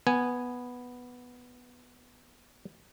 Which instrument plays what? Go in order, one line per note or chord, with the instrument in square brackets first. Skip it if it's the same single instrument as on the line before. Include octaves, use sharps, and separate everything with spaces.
[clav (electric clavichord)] B3 G#5